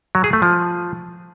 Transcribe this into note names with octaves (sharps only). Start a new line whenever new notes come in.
F#3
G#4
A3
F3